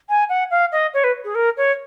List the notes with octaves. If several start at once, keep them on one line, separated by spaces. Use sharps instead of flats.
G#5
F#5
F5
D#5
C#5
B4
G#4
A#4
C#5